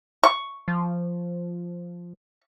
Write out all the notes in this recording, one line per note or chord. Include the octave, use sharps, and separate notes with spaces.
C#6
F3